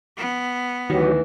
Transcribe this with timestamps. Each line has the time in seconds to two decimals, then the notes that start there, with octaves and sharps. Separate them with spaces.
0.17 B3
0.90 D2 D#3 E3 F#3 F#4 G4